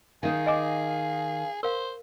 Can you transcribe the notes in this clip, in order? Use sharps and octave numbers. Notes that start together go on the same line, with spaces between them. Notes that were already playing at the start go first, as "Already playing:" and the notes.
D#3 D#4 G#4 F5
D#5 G#5 D6
A#4 C5 F5